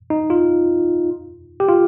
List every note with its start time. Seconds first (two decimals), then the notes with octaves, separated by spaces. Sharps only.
0.10 D#4
0.30 F4
1.60 G4
1.69 F4